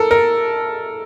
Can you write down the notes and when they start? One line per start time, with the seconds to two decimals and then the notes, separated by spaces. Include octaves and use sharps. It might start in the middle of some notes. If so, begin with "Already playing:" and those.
Already playing: A4 A#4
0.11 A#4